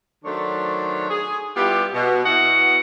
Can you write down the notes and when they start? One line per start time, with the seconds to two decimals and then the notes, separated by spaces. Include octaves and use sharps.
0.25 D#3 F#3 A3 D4 C5 C#5
1.09 G#4
1.56 G3 B3 E4 F4 G4
1.93 B2
2.24 B2 E4 F#4 D#5 F#5